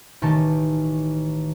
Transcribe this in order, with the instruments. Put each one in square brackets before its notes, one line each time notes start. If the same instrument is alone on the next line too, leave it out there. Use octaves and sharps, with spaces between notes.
[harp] A1 D#3 A5